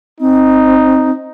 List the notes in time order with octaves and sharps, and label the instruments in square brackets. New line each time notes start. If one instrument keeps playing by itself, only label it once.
[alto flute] C4 [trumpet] D#4